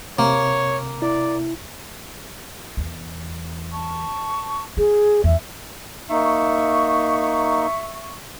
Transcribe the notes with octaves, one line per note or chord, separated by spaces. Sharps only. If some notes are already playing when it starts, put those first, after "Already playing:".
C3 A#3 C#5
E4 D5
E2
A5 C#6
F4 G#4
E2 E5
A#3 D#4 E5 C#6